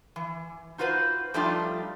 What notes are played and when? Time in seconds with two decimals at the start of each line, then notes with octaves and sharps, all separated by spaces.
0.16 E3
0.78 D#4 F4 F#4 B4 C5
1.34 F3 G3 A3 D4 D#4 F4